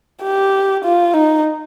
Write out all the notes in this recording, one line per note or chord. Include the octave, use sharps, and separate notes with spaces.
G4
F4
D#4